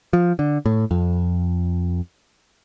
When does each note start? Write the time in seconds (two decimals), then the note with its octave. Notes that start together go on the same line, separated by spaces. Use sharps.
0.13 F3
0.39 D3
0.66 A2
0.91 F2